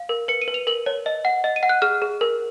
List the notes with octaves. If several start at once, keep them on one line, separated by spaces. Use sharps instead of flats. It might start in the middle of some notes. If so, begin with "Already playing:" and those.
Already playing: F5
A#4
B4 C#7
D#7
B4
F7
A#4 F#7
C#5
D#5
F#5
D#5
D#7
F#5
F#6
G#4 F6
G#4
A#4